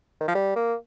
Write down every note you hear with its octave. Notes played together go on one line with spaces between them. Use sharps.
D#3
F3
G3
A#3